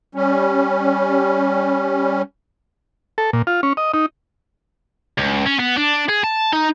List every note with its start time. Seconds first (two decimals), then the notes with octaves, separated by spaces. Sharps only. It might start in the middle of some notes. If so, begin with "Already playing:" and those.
0.15 G3 C#4
3.18 A4
3.33 A#2
3.47 F4
3.63 C#4
3.77 D#5
3.94 D#4
5.18 C#2
5.46 C#4
5.59 B3
5.77 D4
6.09 G#4
6.23 A5
6.53 D#4